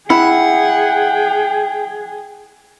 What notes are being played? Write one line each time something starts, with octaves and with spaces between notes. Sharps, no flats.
E4 G#4 F#5 G5